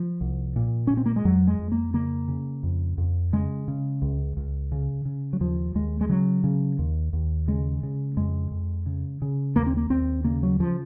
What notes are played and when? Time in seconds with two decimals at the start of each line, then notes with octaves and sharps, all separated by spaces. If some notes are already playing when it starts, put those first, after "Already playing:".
Already playing: F3
0.21 C2
0.56 A#2
0.87 A#2 C#4
0.97 C4
1.06 A#3
1.16 G#3
1.25 F2 F#3
1.47 G#3
1.59 F2
1.72 A#3
1.94 C#3 A#3
2.28 C#3
2.63 F2
2.98 F2
3.33 C#3 G#3
3.68 C#3
4.02 C#2
4.37 C#2
4.72 C#3
5.05 C#3
5.33 F#3
5.40 D#2 F3
5.75 D#2 G#3
6.01 G#3
6.09 C#3 F#3
6.44 C#3
6.79 D#2
7.13 D#2
7.48 C#3 G#3
7.83 C#3
8.17 F2 G#3
8.51 F2
8.86 C#3
9.22 C#3
9.56 D#2 A#3
9.67 C4
9.77 A#3
9.90 D#2 C4
10.24 C#3 A#3
10.43 F#3
10.60 C#3 F3